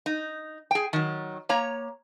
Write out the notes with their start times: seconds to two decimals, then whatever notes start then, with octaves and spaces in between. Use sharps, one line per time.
0.06 D#4
0.71 G#4 G5
0.93 D#3 F#3
1.49 A#3 C#5 A#5